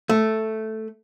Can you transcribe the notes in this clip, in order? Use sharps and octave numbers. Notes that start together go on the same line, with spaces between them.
A3